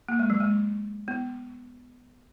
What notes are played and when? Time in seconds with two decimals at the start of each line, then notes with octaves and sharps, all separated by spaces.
0.09 A#3
0.19 G#3
0.30 F#3
0.40 G#3
1.08 B3